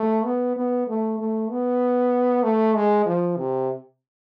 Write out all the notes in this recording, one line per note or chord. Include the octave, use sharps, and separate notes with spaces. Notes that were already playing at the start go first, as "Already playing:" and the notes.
Already playing: A3
B3
B3
A3
A3
B3
A3
G#3
F3
C3